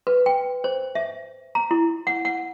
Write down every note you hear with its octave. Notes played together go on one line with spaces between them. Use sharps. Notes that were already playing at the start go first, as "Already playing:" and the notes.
B4
G5
C5
E5
A#5
E4
F#5
F#5